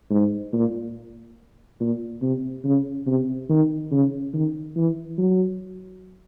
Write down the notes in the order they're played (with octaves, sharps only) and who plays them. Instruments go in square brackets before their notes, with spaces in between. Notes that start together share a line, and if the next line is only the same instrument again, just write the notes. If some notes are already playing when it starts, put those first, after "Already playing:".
[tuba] G#2
A#2
A#2
C3
C#3
C3
D#3
C#3
D#3
E3
F#3